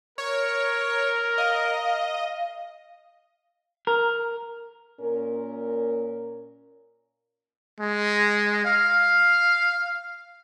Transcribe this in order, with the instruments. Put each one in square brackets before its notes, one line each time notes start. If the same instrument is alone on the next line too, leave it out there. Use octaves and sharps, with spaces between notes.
[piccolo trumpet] A#4 [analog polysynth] C#5
[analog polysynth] D#5 [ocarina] F5
[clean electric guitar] A#4
[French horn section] A#2 C#4 A#4
[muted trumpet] G#3
F5